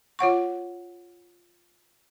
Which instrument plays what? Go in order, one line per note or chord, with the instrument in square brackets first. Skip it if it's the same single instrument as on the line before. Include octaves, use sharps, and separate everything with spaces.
[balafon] F4 C#5 F#5 C#6